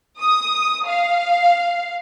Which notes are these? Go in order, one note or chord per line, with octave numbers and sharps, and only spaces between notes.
D#6
F5